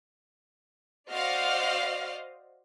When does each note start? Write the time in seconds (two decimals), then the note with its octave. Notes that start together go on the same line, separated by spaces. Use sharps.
1.10 F#4 C5 D5 D#5 F5 F6